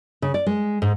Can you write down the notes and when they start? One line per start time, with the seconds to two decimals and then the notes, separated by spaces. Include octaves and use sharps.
0.22 C#3
0.34 D5
0.47 G#3
0.82 G#2